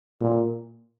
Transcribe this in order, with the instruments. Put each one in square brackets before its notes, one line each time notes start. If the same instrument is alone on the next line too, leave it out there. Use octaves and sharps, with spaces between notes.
[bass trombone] A#2